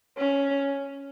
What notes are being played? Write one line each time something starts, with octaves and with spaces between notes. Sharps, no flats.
C#4